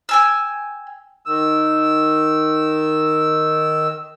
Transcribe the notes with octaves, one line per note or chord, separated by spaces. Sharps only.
G5 G#5 E6
D#3 E6